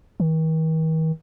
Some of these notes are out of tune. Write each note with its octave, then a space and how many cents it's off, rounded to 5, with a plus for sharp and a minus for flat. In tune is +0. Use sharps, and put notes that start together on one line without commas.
D#3 +45